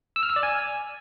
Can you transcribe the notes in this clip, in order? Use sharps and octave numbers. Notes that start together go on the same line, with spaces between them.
E6
F6
E6
D5
G#5